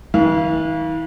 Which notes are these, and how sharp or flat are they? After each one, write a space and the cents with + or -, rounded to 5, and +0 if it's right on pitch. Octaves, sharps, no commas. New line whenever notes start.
E3 -45 F5 -20